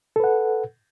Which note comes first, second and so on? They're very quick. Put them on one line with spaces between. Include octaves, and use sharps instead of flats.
A4 B4 F#5